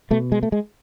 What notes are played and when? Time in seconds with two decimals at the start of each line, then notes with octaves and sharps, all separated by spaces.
0.11 B2 A3
0.32 G#3
0.43 A3
0.52 G#3